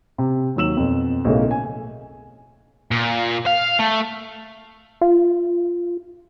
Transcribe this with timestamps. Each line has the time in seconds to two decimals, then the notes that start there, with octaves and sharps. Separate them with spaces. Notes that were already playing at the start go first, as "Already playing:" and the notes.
0.18 C3
0.56 D#2 D#3 F#3 E6 E7 F#7
0.77 F2 B2
1.25 B1 A2 C#3 A#3 E4
1.51 G#5
2.91 A#2
3.47 F5
3.80 A3
5.01 F4